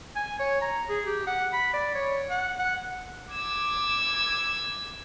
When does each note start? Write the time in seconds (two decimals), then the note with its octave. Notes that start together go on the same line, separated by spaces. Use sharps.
0.16 G#5
0.39 C#5
0.61 A#5
0.89 G#4
1.06 G4
1.27 F#5
1.53 B5
1.73 D5
1.95 C#5
2.30 F#5
2.59 F#5
3.32 D6 E6 G#6